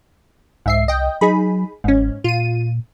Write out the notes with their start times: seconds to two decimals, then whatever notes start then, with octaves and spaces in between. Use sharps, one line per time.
0.66 C2 G#2 E5 C7
0.88 D#5 G5
1.21 F#3 D#4 G#4 B5
1.84 G1 G#2 C#4
2.24 A#2 F4 D#7